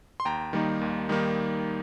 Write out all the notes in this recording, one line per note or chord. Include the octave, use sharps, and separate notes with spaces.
C6
D#2 G5 A#5
D#3 G3 A#3 D#4
D#2
D#3 G3 A#3 D#4